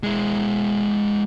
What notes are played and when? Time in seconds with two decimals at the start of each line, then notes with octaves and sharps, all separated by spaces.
0.03 G#3 E4